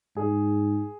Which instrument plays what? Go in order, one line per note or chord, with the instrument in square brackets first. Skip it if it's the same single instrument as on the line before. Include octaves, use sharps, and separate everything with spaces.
[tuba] G#2 [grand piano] G#4